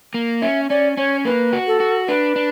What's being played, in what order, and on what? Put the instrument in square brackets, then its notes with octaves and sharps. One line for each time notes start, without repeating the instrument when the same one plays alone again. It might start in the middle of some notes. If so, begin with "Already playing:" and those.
[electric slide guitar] A#3
[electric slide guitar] C#4 [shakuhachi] E5
[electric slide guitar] C#4 [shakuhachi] D5
[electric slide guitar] C#4 [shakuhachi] C#5
[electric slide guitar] A#3 [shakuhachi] B4
[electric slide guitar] F#4
[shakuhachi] A4
[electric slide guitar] F#4
[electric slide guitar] D4 [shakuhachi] B4
[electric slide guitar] D4